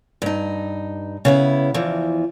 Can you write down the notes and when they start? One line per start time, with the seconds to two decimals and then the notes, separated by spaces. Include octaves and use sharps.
0.22 G2 D#4
1.25 C#3 B3 E4
1.74 E2 E3 F3